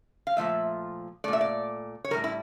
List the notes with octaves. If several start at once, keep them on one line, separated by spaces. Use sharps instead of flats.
F5
A#2 F3 A3 E5
A#2 A3 D5
E5
D5
C#5
A2 E3 G3 A#4
E4